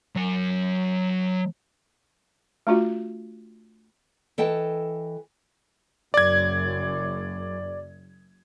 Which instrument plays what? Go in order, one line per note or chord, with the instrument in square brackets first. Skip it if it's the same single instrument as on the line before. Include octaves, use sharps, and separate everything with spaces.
[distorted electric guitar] F#3 G#5
[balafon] A3 D4 F4 F#4
[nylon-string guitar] E3 A4 D#5 G5 A5
[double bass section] F#1 F#2 [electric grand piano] D5 G#6